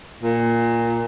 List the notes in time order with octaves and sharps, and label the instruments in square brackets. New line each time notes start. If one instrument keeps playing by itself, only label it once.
[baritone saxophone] A#2